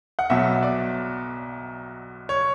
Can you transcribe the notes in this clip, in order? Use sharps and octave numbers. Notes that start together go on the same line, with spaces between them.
F#5
B1 B2 F#3 E5
D5
C#5